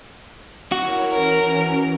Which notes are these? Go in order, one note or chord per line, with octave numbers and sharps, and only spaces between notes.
E4 F#4 A#4 C#5
E3 C#4 A#4